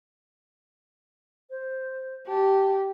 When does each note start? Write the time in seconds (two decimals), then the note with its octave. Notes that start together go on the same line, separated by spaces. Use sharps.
1.50 C5
2.28 G4 A5